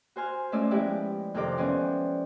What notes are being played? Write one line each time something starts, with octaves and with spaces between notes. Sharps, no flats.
F#4 C5 G#5 F6
G#3 A3 C#4 F4 D5 E6
F3 G#3 B3 E4 G4 D5
F2 C3 D#3 A4 C5 D6
E3 F3 B3 C#4 C5 D5